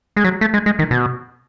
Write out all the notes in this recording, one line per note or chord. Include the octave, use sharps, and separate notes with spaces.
G#3
F#3
A3
G#3
G#3
D#3
B2